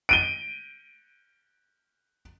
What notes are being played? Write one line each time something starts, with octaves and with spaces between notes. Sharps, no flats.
D7 D#7 G7